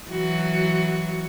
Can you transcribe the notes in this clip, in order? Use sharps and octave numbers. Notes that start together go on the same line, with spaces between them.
E3 F#3 F#4